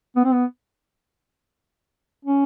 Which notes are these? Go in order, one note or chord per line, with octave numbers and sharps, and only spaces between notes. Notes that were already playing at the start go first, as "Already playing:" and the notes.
B3
C4
B3
C#4